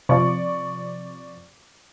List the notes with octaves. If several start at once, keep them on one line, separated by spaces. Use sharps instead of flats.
C3 F3 D5 C#6